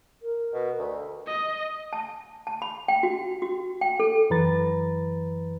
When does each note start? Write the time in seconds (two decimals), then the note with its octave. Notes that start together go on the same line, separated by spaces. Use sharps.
0.23 A#4
0.53 B2
0.78 D2
1.27 D#5
1.93 A5
2.47 A5
2.62 B5
2.88 G5
3.03 F#4
3.42 F#4
3.81 G5
4.00 A4
4.30 F#2 E3 B4 A#5 A6